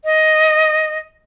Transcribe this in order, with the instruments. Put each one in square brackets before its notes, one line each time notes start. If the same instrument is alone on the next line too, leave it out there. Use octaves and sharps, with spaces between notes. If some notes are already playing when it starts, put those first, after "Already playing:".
[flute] D#5